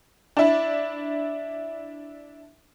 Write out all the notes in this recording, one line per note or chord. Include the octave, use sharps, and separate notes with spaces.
D4 E4